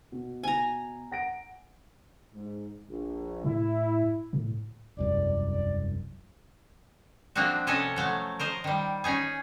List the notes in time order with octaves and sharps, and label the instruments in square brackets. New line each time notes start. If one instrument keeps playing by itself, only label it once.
[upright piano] B2
[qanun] G#5 A#5
[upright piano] F#5 A#6 D7
[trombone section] G#2
A#1
[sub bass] A2 [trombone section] E4
[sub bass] A2
[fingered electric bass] E1 C2 F#2 [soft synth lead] D5
[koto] F3 A#3 C4 D4 F#4
C3 C#4 A4 C#5 D#5 A5
F3 F#3 A3
A#4 C5 D#5
D#3 G3
C#4 D#4 G#4